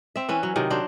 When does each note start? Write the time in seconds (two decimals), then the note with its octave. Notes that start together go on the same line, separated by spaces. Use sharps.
0.16 C4 E5
0.29 E3 C#4 B4
0.43 F#3
0.56 C3 D#3 F#3
0.70 F#3 D4 C5